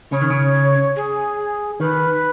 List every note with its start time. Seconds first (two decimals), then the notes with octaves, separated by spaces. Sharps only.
0.12 C#3 C#5
0.21 D#3
0.30 C#3
0.96 G#4
1.80 D#3 B4